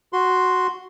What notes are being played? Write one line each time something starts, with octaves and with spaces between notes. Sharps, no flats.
F#4 C6